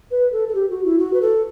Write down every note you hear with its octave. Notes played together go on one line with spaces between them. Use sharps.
B4
A4
A4
G4
F#4
E4
F#4
B4
A4